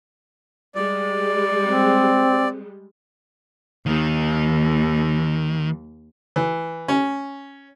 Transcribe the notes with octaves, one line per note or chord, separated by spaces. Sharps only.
G3 G#3 D5
C4
D#2 D#3
E3
C#4